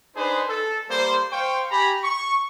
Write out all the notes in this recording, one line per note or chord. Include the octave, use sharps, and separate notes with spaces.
D4 D#4 G#4 B4 C5
A4
G3 A#3 C5
C5 F5 G5 C#6
G4 G#5 A#5 B5
C#6